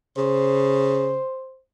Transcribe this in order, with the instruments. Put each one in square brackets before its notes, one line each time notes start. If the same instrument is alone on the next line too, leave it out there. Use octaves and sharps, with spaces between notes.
[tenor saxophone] C#3 [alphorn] C5